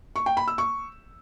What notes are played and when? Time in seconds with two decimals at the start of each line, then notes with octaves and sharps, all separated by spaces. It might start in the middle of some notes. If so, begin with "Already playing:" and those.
0.16 C#6
0.26 G5
0.37 B5
0.48 E6
0.58 C#6